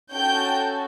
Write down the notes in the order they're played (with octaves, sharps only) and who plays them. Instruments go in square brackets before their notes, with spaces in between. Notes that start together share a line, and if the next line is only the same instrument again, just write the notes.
[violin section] C#4 F#4 A4 G5 G6